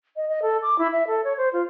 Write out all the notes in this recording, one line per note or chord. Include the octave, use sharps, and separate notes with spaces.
D#5
D#5
A4
D6
E4
E5
A4
C#5
C5
F4